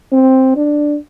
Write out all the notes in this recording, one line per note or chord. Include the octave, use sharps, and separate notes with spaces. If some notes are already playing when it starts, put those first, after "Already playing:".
C4
D4